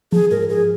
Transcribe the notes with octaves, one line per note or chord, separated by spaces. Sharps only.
F3 G#4
G#2 A#4
G#2 G#4